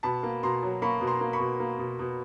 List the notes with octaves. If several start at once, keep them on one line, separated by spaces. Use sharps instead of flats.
B2 A5 B5
A#3
B2 A#5 C6
F#3
A#3 B5 C#6
B2
A#5 C6
A#3
B5 C#6
B2
A#3
B2
B2